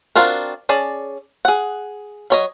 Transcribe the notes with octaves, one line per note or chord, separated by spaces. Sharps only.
C4 D4 F4 F#4 A#4
C#4 G#4 D5 A5
G#4 F#5
F#3 C#5 D#5